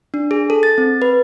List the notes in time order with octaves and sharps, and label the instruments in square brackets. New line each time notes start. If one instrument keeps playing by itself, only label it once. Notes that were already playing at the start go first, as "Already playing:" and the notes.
[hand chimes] D4
G#4
A4
A6
C4
B4